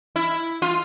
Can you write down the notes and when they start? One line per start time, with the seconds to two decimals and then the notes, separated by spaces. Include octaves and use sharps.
0.16 E4
0.62 F4